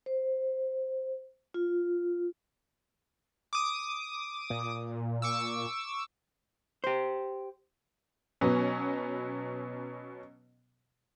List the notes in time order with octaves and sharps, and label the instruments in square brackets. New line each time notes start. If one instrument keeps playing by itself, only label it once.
[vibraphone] C5
F4
[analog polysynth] D6 D#6
[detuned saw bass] A#2
[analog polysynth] C#6 D6 E6
[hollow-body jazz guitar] G4 C5
[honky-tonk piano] B2 F#3 B3 C#4